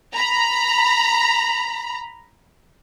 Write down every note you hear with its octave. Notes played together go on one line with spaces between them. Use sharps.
A#5 B5